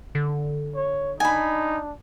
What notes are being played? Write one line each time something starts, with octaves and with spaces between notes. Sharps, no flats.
D3
C#5
D4 D#4 G#5 B5